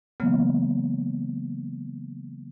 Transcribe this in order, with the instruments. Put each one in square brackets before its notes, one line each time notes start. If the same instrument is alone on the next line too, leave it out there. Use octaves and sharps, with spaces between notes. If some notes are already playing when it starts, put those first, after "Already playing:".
[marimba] C#3 E3 F#3 G#3 A#3 B3